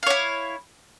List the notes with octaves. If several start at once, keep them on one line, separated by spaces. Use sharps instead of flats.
E4 C#5 F5